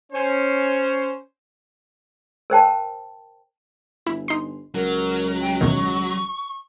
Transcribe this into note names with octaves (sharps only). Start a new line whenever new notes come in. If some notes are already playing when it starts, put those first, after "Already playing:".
C#4 C5
A#4 C5 G5 A5
G1 E4
D#4 C6
C#2 F#3 A#4
G5
E2 B2 D#3 C#6